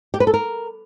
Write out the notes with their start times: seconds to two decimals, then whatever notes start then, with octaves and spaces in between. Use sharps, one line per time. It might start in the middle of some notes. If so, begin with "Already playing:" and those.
0.14 G4
0.20 B4
0.27 A4
0.34 A#4